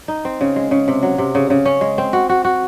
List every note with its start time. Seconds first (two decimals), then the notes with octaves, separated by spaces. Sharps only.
0.08 D#4
0.25 C4
0.41 C#3
0.56 G#3
0.71 C#3
0.88 C3
1.02 F#3
1.18 C3
1.35 C#3
1.50 C#3
1.65 C#4
1.81 G#3
1.98 C4
2.13 F#4
2.29 F#4
2.45 F#4